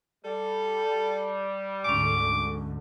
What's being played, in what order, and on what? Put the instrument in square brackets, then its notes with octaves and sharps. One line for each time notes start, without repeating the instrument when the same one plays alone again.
[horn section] G3 [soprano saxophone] A4
[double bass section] D2 G#2 D3 [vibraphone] G#3 C#4 [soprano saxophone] D6